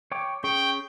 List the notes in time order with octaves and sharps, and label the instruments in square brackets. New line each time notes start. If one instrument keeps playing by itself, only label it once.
[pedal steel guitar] C#5 G5 D6
[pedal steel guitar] C#4 G#4 C#6 [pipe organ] G5